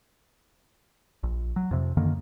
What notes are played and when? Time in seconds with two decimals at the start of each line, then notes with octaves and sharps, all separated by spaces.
1.23 A#1
1.56 F#3
1.71 F2 C3
1.97 F#2 D3 D#3 A#3